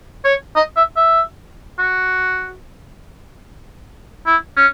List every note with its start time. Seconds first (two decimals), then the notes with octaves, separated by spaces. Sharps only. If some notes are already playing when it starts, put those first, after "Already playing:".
0.24 C#5
0.56 D#5
0.77 E5
0.97 E5
1.79 F#4
4.26 E4
4.57 C#4